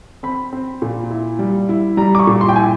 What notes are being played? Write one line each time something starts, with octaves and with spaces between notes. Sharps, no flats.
C4 B5
C4
A#2
E4
G3
E4
G3 A#5
D6
C#6
A#2
C6
G5
E4 G#5